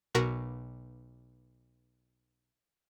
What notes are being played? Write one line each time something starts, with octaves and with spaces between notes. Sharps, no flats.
B1 B2 F#4 A#4 B6